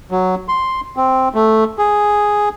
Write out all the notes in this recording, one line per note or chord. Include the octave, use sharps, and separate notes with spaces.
F#3
C6
C4
A3
G#4